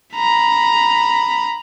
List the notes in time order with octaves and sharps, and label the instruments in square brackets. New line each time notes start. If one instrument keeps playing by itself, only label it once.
[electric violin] A#5 B5